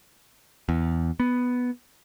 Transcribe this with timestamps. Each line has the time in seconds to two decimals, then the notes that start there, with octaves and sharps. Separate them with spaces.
0.69 E2
1.20 B3